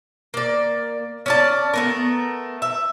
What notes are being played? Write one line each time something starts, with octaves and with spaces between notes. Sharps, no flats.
A#3 D5
C#4 D5 A5
A3 B3 A#4
E5